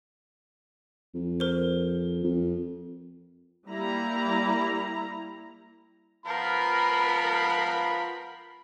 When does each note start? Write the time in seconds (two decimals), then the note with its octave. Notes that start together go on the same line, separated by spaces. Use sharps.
1.14 F2
1.40 A#4 C5
2.24 F2
3.68 G3 A#3 E4 A#5
6.26 F3 B3 F4 A#4 B5